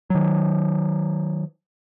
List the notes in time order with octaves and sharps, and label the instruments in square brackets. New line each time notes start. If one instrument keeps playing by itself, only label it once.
[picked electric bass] D#3 F#3